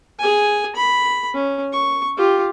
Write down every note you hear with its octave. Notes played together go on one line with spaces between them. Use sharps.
G#4 G#5
B5
C#4
C#6
F4 G4